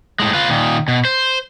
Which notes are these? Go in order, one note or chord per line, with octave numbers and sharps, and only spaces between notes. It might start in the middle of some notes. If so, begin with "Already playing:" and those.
A2 G#3
F4 B4
A#2 D#3
B2
C5